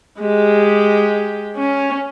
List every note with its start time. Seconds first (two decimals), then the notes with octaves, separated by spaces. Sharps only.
0.19 G#3 G4
1.57 C#4